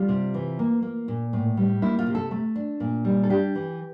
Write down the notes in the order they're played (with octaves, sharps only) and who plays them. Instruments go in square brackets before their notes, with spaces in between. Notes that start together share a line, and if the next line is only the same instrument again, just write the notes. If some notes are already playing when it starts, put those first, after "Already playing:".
Already playing: [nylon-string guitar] G3 F4
C3
E3
A#3
A#3
A#2
A2
G3
A#3 E4
F4
C3
A4
A3
D4
A#2
G3
A4
D4 G4
E3